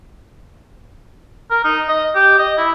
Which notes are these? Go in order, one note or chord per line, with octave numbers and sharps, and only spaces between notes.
A#4
D#4
D#5
G4
D#5
E4